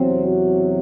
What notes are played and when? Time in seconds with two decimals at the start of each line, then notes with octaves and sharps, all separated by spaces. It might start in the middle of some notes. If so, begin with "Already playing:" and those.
Already playing: E2 C3 F#3 C4
0.25 F#4